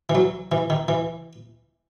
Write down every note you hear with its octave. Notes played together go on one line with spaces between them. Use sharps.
E3
F#3
E3
D#3
E3